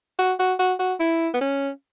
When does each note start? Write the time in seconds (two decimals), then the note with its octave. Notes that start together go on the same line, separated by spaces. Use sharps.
0.19 F#4
0.39 F#4
0.59 F#4
0.79 F#4
1.00 E4
1.34 B3
1.41 C#4